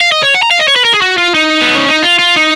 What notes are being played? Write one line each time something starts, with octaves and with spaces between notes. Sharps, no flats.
F5
D#5
C#5
F#5
A#5
F5
D#5
C#5
B4
A#4
G#4
F#4
F4
D#4
B3
C#4
D#4
F4
F4
D#4